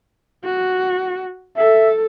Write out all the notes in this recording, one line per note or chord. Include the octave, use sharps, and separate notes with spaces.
F#4
A4 E5